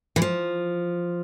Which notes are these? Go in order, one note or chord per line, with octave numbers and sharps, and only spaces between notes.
E3
F3